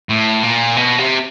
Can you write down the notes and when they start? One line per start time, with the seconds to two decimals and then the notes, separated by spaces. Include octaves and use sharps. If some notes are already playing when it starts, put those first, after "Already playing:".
0.09 A2
0.43 A#2
0.76 B2
0.99 C3